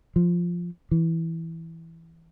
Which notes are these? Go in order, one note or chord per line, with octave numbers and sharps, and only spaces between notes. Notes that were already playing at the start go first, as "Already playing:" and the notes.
F3
E3